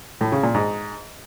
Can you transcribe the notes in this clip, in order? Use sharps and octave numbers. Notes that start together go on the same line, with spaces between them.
A2
C#3
A#2
G#2